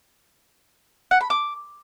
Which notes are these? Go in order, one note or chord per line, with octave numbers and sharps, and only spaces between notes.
F#5
B5
D6